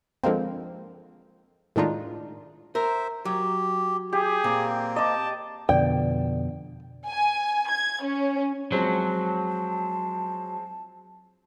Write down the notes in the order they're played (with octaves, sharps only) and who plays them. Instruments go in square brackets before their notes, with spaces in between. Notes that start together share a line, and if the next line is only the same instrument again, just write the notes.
[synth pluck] D3 F3 G#3 A#3 C4
A2 D#3 G#3 D4 D#4 F4
[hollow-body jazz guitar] A#4 [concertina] C5 E5
[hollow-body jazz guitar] F#3 [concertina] G4
[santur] G4 [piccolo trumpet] G#4
[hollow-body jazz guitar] A#2 [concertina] A#3 C4
[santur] D#5 D6 [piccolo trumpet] A5
[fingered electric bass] F2 B2 D3 [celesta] D5 [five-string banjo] G5
[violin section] G#5
G#6
C#4
[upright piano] F3 G#3 C4 [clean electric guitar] F#3 [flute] A5